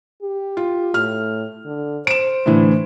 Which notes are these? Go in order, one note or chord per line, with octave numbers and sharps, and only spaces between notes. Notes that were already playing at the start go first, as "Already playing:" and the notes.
G4
F4
A2 F6
D3
C5 D7 E7
A2 D3 E3